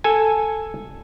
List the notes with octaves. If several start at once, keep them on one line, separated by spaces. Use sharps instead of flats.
A4 G#5